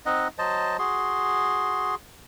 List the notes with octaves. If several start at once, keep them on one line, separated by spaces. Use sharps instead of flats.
C4 D#4 D#5 F#5
F#3 C5 D#5 A5
F#4 G#4 C6